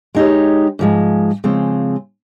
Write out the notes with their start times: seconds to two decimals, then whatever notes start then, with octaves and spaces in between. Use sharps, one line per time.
0.15 G#3 D#4 G4 C#5
0.79 G#2 F3 G#3
1.44 C#3 F3 G#3 C4